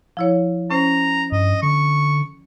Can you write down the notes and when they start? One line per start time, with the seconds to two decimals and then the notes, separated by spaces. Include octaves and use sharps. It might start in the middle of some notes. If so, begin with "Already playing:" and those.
0.17 F3 E4 C#5
0.71 C#4 C5 A#5
1.32 G2 D#5
1.63 D3 C#6